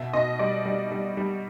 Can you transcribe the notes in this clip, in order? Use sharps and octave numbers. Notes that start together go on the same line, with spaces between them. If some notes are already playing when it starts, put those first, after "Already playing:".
Already playing: B2 E5
B2 D#5
G3 D5
G3
G3
G3